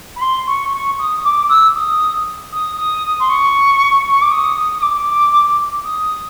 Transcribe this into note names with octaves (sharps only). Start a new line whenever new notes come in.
B5
C6
C#6
C#6
D#6
D6
E6
D#6
D#6
D#6
C6
C#6
C#6
D6
D#6
D#6
D6
D#6